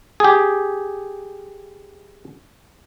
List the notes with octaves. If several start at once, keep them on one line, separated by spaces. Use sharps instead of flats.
G4 G#4